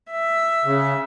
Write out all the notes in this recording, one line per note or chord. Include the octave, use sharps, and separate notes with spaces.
E5
C#3